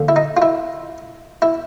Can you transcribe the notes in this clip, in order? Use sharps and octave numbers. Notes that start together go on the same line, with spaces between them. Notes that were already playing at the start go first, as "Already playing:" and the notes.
Already playing: D#2 D3 F3
E4
D#4
F4
E4
E4